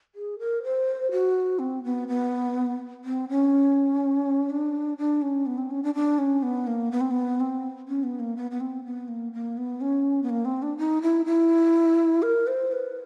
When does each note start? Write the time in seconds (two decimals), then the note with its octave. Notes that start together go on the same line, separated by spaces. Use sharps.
0.15 G#4
0.39 A#4
0.63 C5
1.11 F#4
1.59 C4
1.84 B3
2.08 B3
3.05 C4
3.29 C#4
4.50 D4
4.98 D4
5.22 C#4
5.46 B3
5.58 C4
5.70 C#4
5.83 D4
5.95 D4
6.18 C#4
6.43 B3
6.67 A#3
6.92 B3
7.01 C4
7.11 B3
7.40 C4
7.88 C#4
8.03 B3
8.20 A#3
8.37 B3
8.51 B3
8.60 C4
8.85 B3
9.08 A#3
9.33 A#3
9.57 B3
9.81 C#4
10.23 B3
10.30 A#3
10.45 C4
10.62 D4
10.78 D#4
11.02 E4
11.26 E4
12.22 A#4
12.47 C5
12.72 B4